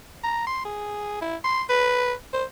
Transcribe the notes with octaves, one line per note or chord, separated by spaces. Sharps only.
A#5
C6
G#4
E4
C6
B4
C5